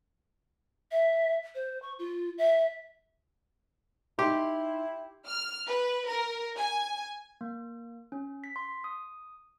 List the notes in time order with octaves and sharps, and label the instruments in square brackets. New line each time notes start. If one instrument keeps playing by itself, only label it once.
[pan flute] E5
C5
C#6
F4
E5
[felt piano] D#4 C6 [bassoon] E4 [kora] G4
[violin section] F6
B4
A#4
G#5
[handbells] A#3
C#4
B6
C6
D#6